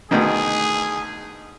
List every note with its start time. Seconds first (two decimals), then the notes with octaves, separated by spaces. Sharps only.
0.11 D2 B2 D#3 G#4